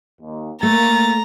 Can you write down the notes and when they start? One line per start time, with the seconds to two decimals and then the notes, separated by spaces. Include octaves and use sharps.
0.22 D#2
0.63 A3 A#3 A#5 A6